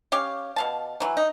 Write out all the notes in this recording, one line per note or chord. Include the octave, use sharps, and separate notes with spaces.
C#4 G4 C#5 F5
B2 F5 A5
E3 F#3
D#4